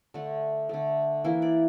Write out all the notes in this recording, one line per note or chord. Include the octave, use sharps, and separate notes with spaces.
D3 A3 D4
D3 A3
E3 A#3 E4
D5